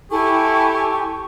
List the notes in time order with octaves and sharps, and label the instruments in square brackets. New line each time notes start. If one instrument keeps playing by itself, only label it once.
[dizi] E4 [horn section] G4 [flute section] A4 G5 G#5 [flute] C#6